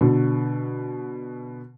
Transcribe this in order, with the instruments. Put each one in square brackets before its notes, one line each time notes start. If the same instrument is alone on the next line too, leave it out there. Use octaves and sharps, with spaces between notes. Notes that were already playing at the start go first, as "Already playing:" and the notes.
[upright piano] B2 D3